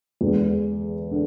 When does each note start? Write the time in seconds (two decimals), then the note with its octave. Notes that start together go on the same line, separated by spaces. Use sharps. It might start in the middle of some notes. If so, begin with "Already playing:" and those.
0.21 E2 D3 G#3
1.11 D3